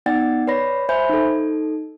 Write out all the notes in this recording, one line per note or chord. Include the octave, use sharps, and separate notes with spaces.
B3 D#4 D5 F#5 G5 A6
B4 C#5 D5 B5 A#6
C5 E5 G#5 B5 G6
D#4 A4